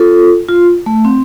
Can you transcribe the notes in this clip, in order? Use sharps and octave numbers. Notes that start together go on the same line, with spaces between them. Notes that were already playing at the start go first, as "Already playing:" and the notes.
Already playing: F4 A4
F4
A3
C4